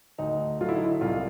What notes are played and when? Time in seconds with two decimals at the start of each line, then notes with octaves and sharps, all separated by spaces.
0.18 D2 D#4
0.60 D3 F#3 F4
0.69 E4
0.76 D#4
0.84 E4
1.01 C2 F4